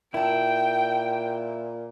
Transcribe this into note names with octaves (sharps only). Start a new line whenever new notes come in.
A#2 E4 G5 A5